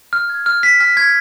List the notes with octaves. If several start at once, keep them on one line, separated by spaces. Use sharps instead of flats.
F6
G#6
F6
B6
F6
G#6